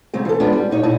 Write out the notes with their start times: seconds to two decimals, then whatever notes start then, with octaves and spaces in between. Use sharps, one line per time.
0.14 C#3 F#3 G#3 C4
0.25 E3 A4
0.40 G#3 B3 C#4 D4 F4
0.53 G3
0.71 A#2 D#4 C#5
0.83 A#2 D#4 E4 A5